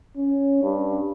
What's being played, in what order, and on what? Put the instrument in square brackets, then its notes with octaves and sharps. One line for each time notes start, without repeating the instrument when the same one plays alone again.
[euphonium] C#4
G2